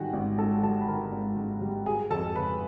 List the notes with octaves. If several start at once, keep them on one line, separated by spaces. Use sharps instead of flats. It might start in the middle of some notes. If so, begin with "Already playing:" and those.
Already playing: G#2 D#3 G3 F#4 F#5 G#5
G#1
G#2 A4 A5
G3 A4 A5
B5
D#3 A#4 A#5
G#1
G#2
G3
F#3 G#4 G#5
F2 A4 A5
C#3 B4 B5